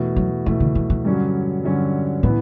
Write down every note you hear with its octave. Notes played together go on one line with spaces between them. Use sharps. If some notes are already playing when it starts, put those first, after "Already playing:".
Already playing: E2 B2 A3
F#3
E2 B2 E3 A3
D3
E3
E3
G2 D3 F#3 C#4
G2 D3 F#3 C#4
A2 E3 B3